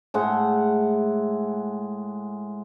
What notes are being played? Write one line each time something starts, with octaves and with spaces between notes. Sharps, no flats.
A2 G#3 F#5